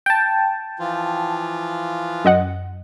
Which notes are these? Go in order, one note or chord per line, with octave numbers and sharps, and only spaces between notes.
G5 A5
E3 F3 F4
F#2 D#5 F#5